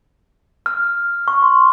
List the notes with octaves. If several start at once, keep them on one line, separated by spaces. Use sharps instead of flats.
F6
C#6
C6